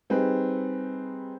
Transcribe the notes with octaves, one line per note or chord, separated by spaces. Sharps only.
G3 C4 D#4 G#4 B4